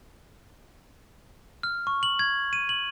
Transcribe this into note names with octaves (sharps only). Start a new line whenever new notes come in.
F6
C#6
F#7
G#6
D#7
F#7